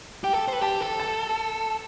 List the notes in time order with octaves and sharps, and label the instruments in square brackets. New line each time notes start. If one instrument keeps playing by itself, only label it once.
[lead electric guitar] G4 [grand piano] G5
[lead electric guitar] A4
C5
B4
[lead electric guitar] G4 [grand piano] A5
[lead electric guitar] A4
[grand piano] A5